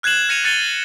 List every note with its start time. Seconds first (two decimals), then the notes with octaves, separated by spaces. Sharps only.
0.03 F6 F#6 G#6 C7 E7 F#7
0.29 F6 A#6 C#7 D#7 F7
0.44 F#6 A6 C#7 D#7 F7 G7